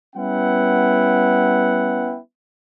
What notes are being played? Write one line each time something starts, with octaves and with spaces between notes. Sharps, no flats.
G3 B3 C#4 E4 F#5 G5